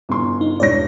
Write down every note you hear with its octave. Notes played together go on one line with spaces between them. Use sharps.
G1 C#3 C6
D#4
E1 G2 C#5 D5 A#6